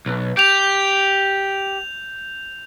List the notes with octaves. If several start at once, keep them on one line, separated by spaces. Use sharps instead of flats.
B1
G4 G6 F7